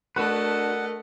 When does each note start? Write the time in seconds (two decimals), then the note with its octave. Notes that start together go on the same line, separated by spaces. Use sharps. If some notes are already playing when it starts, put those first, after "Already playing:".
0.16 A3 D4 F#4 A#4 B4 D#5 F#5